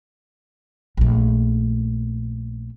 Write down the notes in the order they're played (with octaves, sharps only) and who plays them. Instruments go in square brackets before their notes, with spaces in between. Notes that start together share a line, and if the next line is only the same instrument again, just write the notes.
[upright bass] A#1 A3